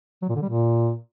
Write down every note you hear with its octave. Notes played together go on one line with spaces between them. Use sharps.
F#3
A#2
D3
G3
A#2